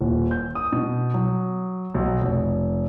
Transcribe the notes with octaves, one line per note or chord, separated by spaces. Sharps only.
D#1
G6
D#6
B2
F#3
B1
F1